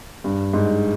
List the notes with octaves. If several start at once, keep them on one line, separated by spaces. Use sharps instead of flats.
G2
G#2